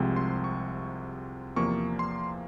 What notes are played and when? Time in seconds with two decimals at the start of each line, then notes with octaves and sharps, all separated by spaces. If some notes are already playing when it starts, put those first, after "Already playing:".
Already playing: C2 C3 F3 G#3 C4
0.16 C6
0.44 C#6
1.56 E2 C3 F3 A#3 C#6
1.99 C6